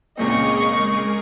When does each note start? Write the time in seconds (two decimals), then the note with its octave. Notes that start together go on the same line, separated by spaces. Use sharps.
0.17 C#2 A#2 C#3 C4 G#4 A#4 D#5 C#6
0.78 G#3 G#4 A#4